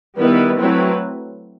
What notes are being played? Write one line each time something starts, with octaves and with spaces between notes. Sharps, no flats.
D#3 G3 B3 E4 B4
F#3 A3 C4 E4 B4